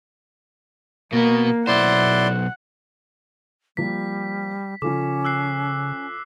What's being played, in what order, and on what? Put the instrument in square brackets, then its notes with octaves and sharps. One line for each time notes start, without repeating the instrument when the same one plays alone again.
[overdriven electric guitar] B2 B3 [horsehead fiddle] A#3
[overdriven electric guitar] B1 C5 [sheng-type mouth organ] E4 D5 C6 [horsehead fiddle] F#5
[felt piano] F3 A#3 [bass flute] G3 [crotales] B6
[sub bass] C#3 [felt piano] F3 F4 A4 [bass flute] C#4 [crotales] D6
[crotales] E6 F#6 C7